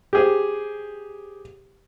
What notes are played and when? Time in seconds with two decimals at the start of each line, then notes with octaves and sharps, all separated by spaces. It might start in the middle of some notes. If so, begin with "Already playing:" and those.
0.13 G4 G#4 C5